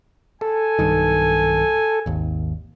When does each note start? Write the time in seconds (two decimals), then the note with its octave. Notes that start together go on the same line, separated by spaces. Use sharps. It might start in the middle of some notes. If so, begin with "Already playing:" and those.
0.41 A4 G#5
0.79 B1 G2 D#3
2.06 G#1 D#2